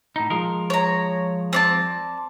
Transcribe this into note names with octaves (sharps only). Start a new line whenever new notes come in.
A2 D#4
F3 G#3 A#4
C#5 A#5
C4 D5 A5